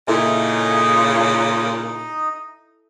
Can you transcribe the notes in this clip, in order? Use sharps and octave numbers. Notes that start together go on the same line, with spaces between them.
A#2 C#3 D#4 E4 A4 D#5 E5